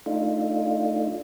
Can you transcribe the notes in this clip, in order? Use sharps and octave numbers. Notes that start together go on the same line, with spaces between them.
A3 D4 D#4 F4